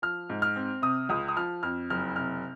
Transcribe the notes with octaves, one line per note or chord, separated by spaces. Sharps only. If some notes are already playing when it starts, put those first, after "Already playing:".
F3 F6
G#2
F6
C4
C3 D#6
C#2 D#6
D#6
F3 F6
F2 F6
F#1 F6
C3 F6